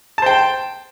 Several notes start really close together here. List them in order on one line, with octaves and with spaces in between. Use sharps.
A5 C5 G5